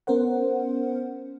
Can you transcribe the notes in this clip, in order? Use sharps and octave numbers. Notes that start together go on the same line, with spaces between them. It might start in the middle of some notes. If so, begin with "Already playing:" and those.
B3 C#4 A#4 C5 F#5